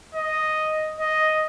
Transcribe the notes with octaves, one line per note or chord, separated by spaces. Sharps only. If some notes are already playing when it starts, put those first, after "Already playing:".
D#5
D#5